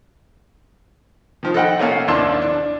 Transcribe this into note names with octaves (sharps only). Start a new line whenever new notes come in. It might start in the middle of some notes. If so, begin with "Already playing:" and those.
D#3 F3
A4 D#5 F#5 G5
A3 A#3 C#4 A4 F5 G#5
A1 D#2 D4 A5 C6 E6
D4